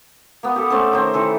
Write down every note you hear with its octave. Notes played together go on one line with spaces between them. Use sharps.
A#3 B3
G4 A4
A3 C4 C#4 A4
D#3 C4
D#3 E3 A4 B4